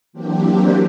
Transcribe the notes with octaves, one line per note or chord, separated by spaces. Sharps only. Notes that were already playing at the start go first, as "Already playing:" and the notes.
E3 F#3 A#3 C4 D4 G4